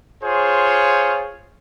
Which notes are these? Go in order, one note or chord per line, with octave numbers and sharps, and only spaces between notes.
F4 G#4 C5 C#5